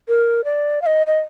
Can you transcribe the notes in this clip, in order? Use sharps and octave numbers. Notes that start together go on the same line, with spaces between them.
A#4
D5
F5
D#5
D#5